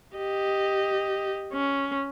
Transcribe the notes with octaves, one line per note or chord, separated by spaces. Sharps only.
G4 D#5
C#4